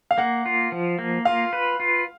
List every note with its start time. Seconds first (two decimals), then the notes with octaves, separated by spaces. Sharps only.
0.11 F5
0.18 A#3 F#5
0.46 F4
0.72 F3
0.99 A#3
1.25 F4 F5
1.53 B4
1.80 F4